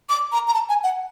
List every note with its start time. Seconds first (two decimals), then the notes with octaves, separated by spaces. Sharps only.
0.09 D6
0.32 A#5
0.48 A#5
0.54 A5
0.69 G#5
0.83 F#5